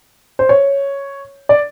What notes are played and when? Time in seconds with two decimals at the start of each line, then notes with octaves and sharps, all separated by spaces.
0.39 C5
0.49 C#5
1.49 D5